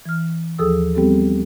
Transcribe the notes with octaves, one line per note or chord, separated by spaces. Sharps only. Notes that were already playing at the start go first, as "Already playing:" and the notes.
E3 F6
D#2 F3 G#4 A4 D#6 E6
G3 B3 C4 G4 A4